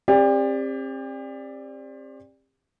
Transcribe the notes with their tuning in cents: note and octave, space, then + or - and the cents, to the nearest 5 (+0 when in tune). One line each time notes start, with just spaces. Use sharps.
C4 +35 G4 +35 D5 +0